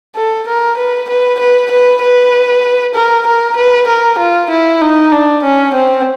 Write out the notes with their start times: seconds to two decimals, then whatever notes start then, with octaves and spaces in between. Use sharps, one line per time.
0.15 A4
0.47 A#4
0.77 B4
1.09 B4
1.39 B4
1.71 B4
2.02 B4
2.95 A#4
3.26 A#4
3.56 B4
3.88 A#4
4.19 F4
4.50 E4
4.81 D#4
5.12 D4
5.43 C#4
5.74 C4